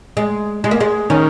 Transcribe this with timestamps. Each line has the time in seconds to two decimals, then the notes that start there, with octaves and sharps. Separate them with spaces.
0.17 G#3
0.64 G#3
0.71 A#3
0.81 G#3
1.10 D#3 C#4